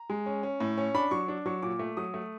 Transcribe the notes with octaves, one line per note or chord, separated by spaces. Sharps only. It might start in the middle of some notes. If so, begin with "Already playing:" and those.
Already playing: A#5
G#3
C#4
C#4
A2
C#4
D4 B5
F#3 C#6
D4
F#3 C#6
A#2 D6
A3
F#3 D#6
A3